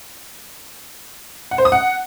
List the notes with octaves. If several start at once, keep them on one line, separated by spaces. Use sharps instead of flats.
F#5
C5
D#6
F#5